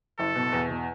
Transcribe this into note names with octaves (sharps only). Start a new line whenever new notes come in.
F#1 A4
B2
E2
B2